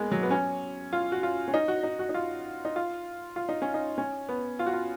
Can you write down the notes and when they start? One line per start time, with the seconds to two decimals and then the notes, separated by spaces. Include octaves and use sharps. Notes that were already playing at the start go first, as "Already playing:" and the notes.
Already playing: G#3 A#3 B3
0.11 F#3
0.23 B3
0.31 C#4
0.93 F4
1.12 F#4
1.23 F4
1.48 C#4
1.54 D#4
1.68 F#4
1.83 D#4
1.99 F#4
2.09 D#4
2.14 F4
2.65 D#4
2.76 F4
3.36 F4
3.49 D#4
3.62 C#4
3.74 D#4
3.98 C#4
4.29 B3
4.59 F4
4.66 F#4
4.73 F4